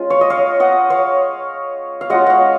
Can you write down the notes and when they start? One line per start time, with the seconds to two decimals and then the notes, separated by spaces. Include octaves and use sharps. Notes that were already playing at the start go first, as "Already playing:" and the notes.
Already playing: G#3 C#4 F4
0.10 C#5 F5
0.21 D#5
0.30 C#5 F5
0.60 D#5 F#5
0.90 C#5 F5
2.01 F5
2.10 G#3 C#4 F4 D#5 F#5
2.27 C#5 F5 F#5